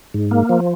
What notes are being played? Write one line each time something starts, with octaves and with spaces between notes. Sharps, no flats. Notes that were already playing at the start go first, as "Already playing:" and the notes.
G#2
A#3
F3